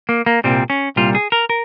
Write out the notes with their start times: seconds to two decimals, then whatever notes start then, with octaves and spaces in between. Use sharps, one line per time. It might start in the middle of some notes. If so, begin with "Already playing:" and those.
0.09 A#3
0.26 A#3
0.44 C2 A#2 G3 C4
0.70 C#4
0.96 C2 A#2 G3 F4
1.15 G#4
1.32 A#4
1.50 A#4